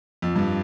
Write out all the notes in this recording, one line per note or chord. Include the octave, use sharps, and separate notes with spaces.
F2
G2